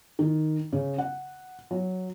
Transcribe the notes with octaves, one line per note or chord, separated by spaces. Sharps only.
D#3
C#3
F#5
F#3